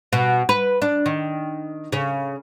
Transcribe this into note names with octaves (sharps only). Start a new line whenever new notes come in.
B2
B4
D4
D#3
C#3